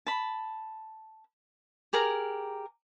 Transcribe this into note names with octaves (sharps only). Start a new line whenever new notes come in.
A5 B5
G4 G#4 A#4 A#5